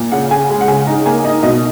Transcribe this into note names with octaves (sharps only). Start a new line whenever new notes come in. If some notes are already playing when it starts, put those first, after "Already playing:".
Already playing: A#2
C#3 F#5
C#3 G#5
G#3
F#5
C#3 G#5
D#4 A#5
A#3 G#5
D#4 D#5
B2 D#5